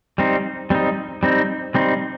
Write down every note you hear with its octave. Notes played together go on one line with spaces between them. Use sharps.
G3 C4 D#4
G3 C4 D#4
G3 C4 D#4
G3 C4 D#4